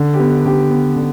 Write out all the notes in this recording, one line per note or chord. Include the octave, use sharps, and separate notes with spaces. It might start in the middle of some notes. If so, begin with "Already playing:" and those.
Already playing: D3
G4
B3
D3 G4
B3
D3